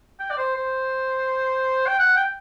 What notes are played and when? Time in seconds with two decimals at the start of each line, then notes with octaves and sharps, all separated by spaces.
0.20 G5
0.30 D5
0.38 C5
0.56 C5
1.86 G5
1.99 F#5
2.16 G5